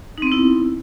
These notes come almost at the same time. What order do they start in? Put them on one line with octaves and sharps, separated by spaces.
D#4 C4 B3 E4